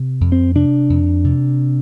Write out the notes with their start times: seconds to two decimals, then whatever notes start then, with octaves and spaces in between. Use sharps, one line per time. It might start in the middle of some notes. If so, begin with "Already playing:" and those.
Already playing: C3
0.21 F2
0.32 C4
0.55 C3 D4
0.90 F2
1.24 C3